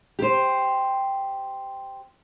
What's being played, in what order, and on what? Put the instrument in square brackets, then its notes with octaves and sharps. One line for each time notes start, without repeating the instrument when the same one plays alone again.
[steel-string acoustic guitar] G4 C5